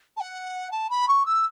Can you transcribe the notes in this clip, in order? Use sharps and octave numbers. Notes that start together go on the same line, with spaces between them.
A5
F#5
A5
B5
C#6
E6